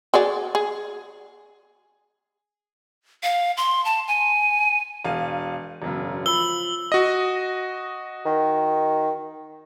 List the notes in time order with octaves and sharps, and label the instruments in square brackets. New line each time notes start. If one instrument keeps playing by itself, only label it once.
[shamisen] F#4 G#4 D5
G#4
[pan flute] F5
C6
A5
G#5
[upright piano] E1 F5
E1 F#2 C#3
[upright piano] F3 B5 [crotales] E6 G7
[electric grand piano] F#4 D#5
[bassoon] D#3